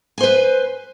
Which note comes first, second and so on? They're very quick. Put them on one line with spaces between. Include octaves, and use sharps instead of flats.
G#5 C5 B4